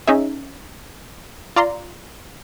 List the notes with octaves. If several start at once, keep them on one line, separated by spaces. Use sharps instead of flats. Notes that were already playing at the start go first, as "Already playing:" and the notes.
C#4 D#4 G#4 E5
F4 D5 A#5 C6